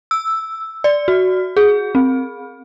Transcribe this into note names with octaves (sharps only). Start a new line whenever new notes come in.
E6
D5
F#4
G#4
C4